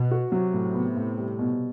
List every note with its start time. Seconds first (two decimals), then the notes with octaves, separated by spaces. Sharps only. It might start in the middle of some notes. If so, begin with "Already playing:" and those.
Already playing: B2
0.11 F#4
0.32 C3 F#3
0.53 A2
0.74 B3
0.96 A2
1.18 G3
1.39 B2